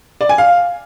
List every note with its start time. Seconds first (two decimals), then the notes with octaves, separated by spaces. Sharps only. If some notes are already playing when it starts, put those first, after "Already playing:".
0.21 D5
0.29 G#5
0.38 F5